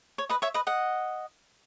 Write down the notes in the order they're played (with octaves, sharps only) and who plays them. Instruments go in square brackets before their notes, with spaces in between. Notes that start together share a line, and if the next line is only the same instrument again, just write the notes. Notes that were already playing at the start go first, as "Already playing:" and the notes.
[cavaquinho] C#5
B4 D#5
C#5 E5
B4 D#5
D#5 F#5